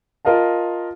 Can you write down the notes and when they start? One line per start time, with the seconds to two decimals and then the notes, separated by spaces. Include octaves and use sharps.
0.25 F4 A#4 D#5 F5 A5